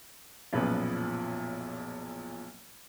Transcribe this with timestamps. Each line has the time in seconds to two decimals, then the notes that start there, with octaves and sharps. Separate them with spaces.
0.53 F#1 B1 A#2 F3 B3 B4